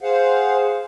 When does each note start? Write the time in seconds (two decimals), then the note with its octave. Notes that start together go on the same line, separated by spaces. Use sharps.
0.01 G#4 C5 F5 F#5